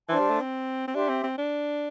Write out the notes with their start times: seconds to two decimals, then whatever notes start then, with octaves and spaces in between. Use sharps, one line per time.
0.09 E3 D4 C5 A5 C6
0.19 G3
0.30 A3
0.41 C4
0.88 C4
0.95 D4 G4 E5 C6
1.09 C4
1.24 C4
1.38 D4